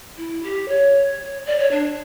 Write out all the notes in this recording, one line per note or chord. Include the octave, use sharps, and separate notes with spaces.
E4
G4
C#5
D5
C#5
D4